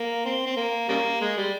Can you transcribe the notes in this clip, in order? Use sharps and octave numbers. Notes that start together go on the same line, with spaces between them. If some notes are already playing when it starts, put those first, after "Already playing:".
Already playing: A#3
C4
C4
A#3
C#3 G3 A#3
G#3
G3